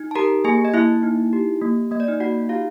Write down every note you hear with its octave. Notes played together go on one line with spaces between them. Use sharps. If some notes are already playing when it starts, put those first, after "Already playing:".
Already playing: D#4
A5
G4 A#4 A#5
A#3 G#4 G#5
D#5
A#3 E4 E5
D#4
G4
A#3
A#3 D#5
D5
D#4 D#5
D#4 F#4 F#5
F4 G4 F5